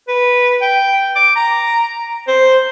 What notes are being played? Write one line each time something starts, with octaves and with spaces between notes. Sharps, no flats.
B4
G5
D6
A#5
C5